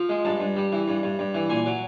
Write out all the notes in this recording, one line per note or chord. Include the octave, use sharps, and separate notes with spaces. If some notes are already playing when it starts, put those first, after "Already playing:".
Already playing: F3
G#3
G2 A5
G2
G3
E3
G2
G2
G2
E3
A#2 G#5
F#3